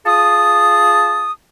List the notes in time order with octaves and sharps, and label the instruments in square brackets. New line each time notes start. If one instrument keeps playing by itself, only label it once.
[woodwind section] F4 G#4 A5 D#6